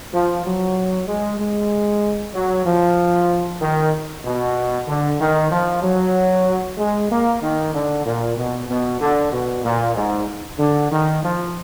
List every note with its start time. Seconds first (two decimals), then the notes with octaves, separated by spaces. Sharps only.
0.13 F3
0.45 F#3
1.07 G#3
1.39 G#3
2.34 F#3
2.66 F3
3.61 D#3
4.25 B2
4.88 D3
5.20 D#3
5.52 F3
5.83 F#3
6.78 G#3
7.10 A#3
7.42 D#3
7.74 D3
8.05 A#2
8.37 B2
8.69 B2
9.01 D3
9.33 B2
9.64 A#2
9.96 G#2
10.59 D3
10.91 D#3
11.23 F3